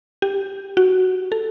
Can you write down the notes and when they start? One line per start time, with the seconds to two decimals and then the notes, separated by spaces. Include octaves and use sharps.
0.22 G4
0.77 F#4
1.32 A4